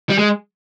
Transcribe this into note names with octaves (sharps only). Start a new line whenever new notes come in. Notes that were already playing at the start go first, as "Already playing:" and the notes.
G3
G#3